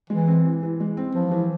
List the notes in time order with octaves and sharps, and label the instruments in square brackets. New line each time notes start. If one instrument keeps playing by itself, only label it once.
[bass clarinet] E3 [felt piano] G#3
[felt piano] C4
E3
E3
G#3
C4
[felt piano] E3 [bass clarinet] F3
[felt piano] E3